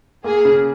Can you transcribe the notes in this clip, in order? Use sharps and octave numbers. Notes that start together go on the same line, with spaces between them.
A#3 G#4
C#3